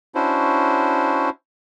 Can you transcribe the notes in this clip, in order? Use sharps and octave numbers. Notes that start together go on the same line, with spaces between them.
C#4 D4 E4 F#4 C5